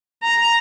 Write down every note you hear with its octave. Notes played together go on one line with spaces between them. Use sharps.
A#5